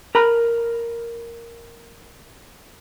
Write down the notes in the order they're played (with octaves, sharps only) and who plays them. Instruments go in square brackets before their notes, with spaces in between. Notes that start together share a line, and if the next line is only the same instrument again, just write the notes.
[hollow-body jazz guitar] A#4 A#5 B5